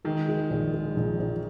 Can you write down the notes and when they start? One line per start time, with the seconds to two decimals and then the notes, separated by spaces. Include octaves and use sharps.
0.04 D#3 G#3
0.28 G#3
0.50 A#1
0.74 G#3
0.97 A#1
1.19 A#1